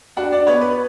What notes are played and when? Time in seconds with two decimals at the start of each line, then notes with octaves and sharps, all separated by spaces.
0.16 D4 F#4 F#5
0.32 D4 D5
0.47 B3 C#5
0.61 B4